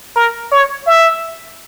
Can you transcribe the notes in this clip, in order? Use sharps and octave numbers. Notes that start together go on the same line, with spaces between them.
A#4
C#5
E5